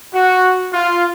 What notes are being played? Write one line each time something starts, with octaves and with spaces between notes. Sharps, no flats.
F#4
F4